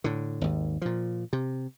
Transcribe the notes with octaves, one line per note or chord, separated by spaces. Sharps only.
A2 D3
G#1 D#2
A#2 F3
C3